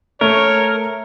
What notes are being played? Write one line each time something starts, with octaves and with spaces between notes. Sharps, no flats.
A3 A#4 C#5